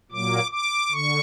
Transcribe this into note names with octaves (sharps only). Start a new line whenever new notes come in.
A#2 F#3 A#3 D6
D6
D3 C#6